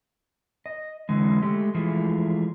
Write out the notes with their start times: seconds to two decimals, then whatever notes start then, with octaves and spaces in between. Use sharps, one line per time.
0.66 D#5
1.09 D3 E3 G#3
1.42 G#3 A3 G4
1.74 E3 F3 G#3 A3 E4